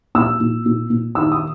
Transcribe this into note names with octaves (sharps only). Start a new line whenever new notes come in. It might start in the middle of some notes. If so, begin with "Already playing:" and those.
A#2 E6
A#2
A#2
A#2
D#3 E6
D#6